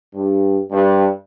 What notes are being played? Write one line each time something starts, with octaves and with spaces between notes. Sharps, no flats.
G2
G2